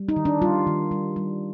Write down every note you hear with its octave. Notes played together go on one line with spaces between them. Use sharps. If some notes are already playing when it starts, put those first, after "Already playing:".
Already playing: G3
D#4
D#3
D4
G3 F4
D#3
G3
G3